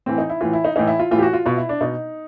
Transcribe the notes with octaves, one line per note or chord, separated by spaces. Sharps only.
A2 E3 C4
D#4
E4
A2 E3 F4
E4
D#4
A2 E3 D#4
E4
F4
A2 E3 F4
G4
F#4
F4
B2 F4
E4
D4
B2 D#4